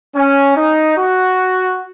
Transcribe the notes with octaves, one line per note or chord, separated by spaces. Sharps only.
C#4
D#4
F#4